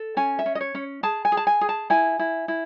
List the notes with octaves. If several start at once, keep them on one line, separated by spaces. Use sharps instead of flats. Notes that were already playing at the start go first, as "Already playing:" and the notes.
Already playing: A4
C#4 G#5
E5
C#4
D#5
C#5
C#4
G#4 A5
G#5
G#4
A5
G#5
G#4
A5
E4 G#5
E4
E4